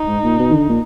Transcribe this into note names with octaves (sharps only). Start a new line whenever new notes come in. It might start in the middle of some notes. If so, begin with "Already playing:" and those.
Already playing: D#4
G#2
A#2
B2
D#3
D3
A#2